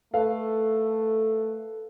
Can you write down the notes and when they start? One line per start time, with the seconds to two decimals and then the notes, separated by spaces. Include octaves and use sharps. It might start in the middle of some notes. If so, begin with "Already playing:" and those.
0.14 A3 A4 B4 F5